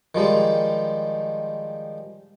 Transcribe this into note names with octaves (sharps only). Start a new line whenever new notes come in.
D#3 F3 G3 G#3